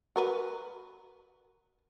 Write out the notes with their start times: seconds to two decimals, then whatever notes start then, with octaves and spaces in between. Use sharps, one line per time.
0.16 F#4 A#4 B4